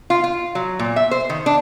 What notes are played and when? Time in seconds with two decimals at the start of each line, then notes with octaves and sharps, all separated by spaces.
0.10 F4
0.24 F4
0.55 F#3
0.79 A#2
0.96 E5
1.11 C5
1.30 D#3
1.46 D4